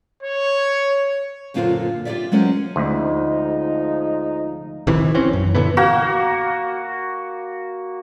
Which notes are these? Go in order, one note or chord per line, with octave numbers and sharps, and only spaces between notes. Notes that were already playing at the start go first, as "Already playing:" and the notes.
C#5
F#2 A#2 D3 F4 A#4 C5
F4 G4 G#4 C#5 D5 E5
F#3 G#3 C#4 A#4 C5
D2 F3 G#3 D#4
A#1 C3 D#3 E3
E3 C4 C#4
F#2
A#2 D3 E3 B3
A#3 F#4